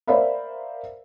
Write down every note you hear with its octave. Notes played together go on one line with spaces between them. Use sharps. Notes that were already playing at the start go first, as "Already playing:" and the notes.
A#4 C5 D5 E5 F5 B5